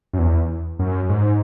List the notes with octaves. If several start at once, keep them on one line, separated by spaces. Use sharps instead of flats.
F#2
E2
F#2
G#2